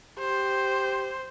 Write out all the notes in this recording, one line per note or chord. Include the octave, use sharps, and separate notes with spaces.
G4 C5